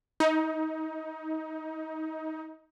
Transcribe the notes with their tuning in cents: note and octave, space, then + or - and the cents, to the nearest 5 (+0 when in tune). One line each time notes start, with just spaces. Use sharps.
D#4 +25